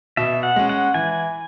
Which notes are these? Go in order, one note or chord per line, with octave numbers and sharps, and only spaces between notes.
B2 E5
F#5
G#3 C#4
F#5
E3 G#5